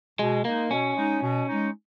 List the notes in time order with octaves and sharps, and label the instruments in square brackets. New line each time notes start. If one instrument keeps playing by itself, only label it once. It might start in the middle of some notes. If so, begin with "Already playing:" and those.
[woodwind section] B2 [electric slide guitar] G#3
[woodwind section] G#3 D#4 [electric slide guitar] A#3
[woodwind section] B2 [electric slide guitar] C#4
[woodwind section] G#3 D#4
B2
G#3 D#4